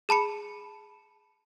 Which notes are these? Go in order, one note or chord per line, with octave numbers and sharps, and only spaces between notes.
G#4 A5 B5 C#7